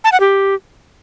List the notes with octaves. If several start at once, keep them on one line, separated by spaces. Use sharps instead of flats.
A5
F#5
G4